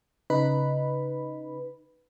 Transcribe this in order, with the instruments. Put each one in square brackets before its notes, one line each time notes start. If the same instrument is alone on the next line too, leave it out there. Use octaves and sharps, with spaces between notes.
[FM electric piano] C#3 D#4 B4 B5